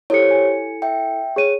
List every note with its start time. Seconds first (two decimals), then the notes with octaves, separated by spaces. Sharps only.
0.10 E4 G4 A4 C5 C#5 C#7
0.31 G#5
0.82 E5 G5
1.36 G#4 C#5 D#7